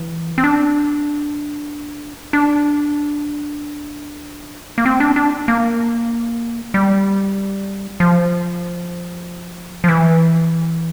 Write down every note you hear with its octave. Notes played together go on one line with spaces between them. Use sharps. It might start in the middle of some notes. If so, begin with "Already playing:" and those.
Already playing: E3
C4
D4
D4
A#3
C4
D4
D4
A#3
G3
F3
F3
E3